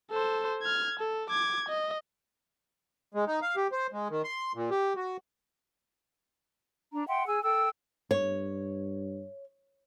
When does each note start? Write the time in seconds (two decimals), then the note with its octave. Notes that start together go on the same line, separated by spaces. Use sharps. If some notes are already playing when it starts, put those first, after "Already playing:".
0.11 A4 C5
0.62 F6 G#6
1.00 A4
1.30 D6 G#6
1.69 D#5
3.14 G#3
3.27 D#4
3.42 F5
3.56 G4
3.72 C5
3.93 G#3
4.10 D#3
4.24 C6
4.55 A#2
4.71 G4
4.96 F#4
6.92 D4 A#5
7.08 E5 F#5 G5 C6
7.26 G#4 G#5 E6
7.43 A4 G5 E6
8.11 G2 C#5